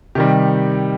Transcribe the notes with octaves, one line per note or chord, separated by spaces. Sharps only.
C3 D#3 G3 G4